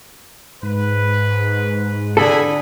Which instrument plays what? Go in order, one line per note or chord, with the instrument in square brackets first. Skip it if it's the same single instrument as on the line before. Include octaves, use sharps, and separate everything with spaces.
[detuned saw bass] G#2 [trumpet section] B4
[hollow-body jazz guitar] D3 A4 [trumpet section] G#4 G#5 B5